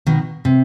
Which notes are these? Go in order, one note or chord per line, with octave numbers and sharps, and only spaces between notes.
B2 D#3
C3